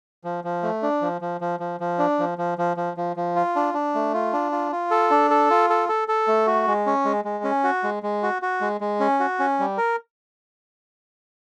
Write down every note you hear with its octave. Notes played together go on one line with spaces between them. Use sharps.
F3
F3
A3
D4
F3
F3
F3
F3
F3
D4
F3
F3
F3
F3
F3
F3
F4
D4
D4
A3
F4
D4
F4
F4
A4
D4
A4
F4
A4
A4
A4
A3
F#4
G#3
C#4
G#3
G#3
C#4
F#4
G#3
G#3
F#4
F#4
G#3
G#3
C#4
F#4
C#4
G3
A#4